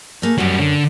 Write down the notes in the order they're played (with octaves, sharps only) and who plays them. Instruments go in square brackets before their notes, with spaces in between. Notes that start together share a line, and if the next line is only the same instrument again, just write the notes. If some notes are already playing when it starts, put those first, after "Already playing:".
[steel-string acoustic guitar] A3 A#3 G#4
[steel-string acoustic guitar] F#2 C#4 [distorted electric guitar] G3 F#4
[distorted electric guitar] D3